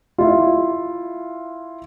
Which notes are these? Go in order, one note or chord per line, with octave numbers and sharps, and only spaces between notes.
E4 F4